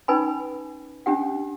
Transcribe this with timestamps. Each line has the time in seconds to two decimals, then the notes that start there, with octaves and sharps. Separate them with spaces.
0.08 C#4 D#4 B4 G#5 B5
1.06 C#4 D4 G4 F#5